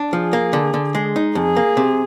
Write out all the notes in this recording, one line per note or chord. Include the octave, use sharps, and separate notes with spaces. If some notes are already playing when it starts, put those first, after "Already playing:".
Already playing: D4
F3 G#4
A#3
D3
D3
G#3
D#4
F2 G#4
A#3
C3